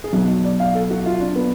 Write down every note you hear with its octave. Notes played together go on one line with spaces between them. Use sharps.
G#4
B1 B2 F#3 F#4
D5
F5
A4
F#4
F4
D4
B3